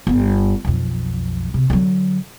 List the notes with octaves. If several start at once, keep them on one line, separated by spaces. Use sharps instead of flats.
G1 B3
B1 F2
C3
D3 F#3